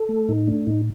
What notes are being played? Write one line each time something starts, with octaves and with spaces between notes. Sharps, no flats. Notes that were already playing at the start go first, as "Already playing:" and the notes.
Already playing: A4
A3
A2 D#4
A3 D4
A2 D#4